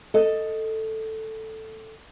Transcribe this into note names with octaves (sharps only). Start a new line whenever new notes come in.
A4 D#5